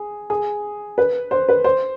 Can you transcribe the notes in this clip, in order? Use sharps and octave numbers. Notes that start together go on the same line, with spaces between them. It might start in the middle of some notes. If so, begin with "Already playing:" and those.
Already playing: G#4
G#4
B4
C5
B4
C5